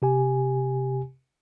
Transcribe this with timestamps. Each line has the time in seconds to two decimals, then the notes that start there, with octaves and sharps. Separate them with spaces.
0.02 C3 G4 G#5